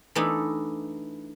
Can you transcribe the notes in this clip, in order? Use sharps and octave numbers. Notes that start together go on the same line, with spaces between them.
E3 A3 B3 D4 D#4 A4